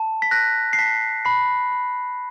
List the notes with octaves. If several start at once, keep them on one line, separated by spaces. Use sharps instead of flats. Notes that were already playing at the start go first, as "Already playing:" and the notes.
Already playing: A5
B6
F#6 A#6
C7
A5 B6
B5 C7
B5